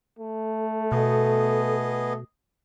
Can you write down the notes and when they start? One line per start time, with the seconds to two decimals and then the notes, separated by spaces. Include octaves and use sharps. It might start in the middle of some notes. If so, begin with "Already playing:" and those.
0.19 A3 A4
0.92 B2 B3 G#4 D#5